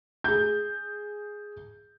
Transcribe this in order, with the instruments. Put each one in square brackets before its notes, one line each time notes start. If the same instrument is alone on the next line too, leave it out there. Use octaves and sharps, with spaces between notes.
[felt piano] G#4 G6